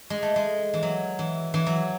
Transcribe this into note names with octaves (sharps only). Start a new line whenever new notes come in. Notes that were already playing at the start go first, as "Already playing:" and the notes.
G#3
A3
G#3
E3
F#3
E3
E3
F#3